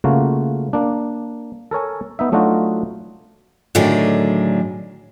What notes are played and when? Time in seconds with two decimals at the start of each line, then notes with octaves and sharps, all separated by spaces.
0.04 C#3 A3 A#3 F4 F#4
0.73 A#3 D4
1.71 A4 A#4 C#5 G#5
2.19 B3 D#4 E5
2.32 F#3 A3 D4 D#4 F4 F#4
3.75 A2 D3 D#3 F#3 G#4 D5